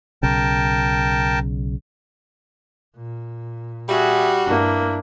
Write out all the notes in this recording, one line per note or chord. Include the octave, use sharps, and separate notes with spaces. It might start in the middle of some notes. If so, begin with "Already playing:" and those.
B1 C#3 A#4 G5 A5
A#2
G3 F#4 G#4 E5
G2 A#3 D4 E4